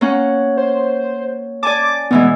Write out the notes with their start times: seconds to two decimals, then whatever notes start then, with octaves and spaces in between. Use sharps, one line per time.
0.01 A#3 C#4 F#5
0.57 C5
1.63 D5 G#5 A5 D6
2.11 B2 E3 G#3 B3